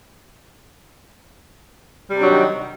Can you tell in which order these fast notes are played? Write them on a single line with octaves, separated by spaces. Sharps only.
G3 C3 D4 F#3 D#3